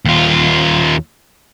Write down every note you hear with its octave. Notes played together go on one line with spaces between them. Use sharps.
D#2 F4